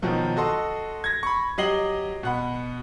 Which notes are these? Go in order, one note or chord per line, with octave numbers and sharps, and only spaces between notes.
B2 D#3 F3 F#3
F#4 A4 D#5 C6
G#6 A#6
B5 C#6
F#3 G4 D#5 C7 F#7 G7
B2 F#5 B5